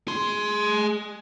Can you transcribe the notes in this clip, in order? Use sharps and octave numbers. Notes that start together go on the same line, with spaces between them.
G#4 C6